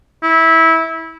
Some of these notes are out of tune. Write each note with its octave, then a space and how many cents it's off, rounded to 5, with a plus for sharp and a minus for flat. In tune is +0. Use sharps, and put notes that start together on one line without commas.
E4 -20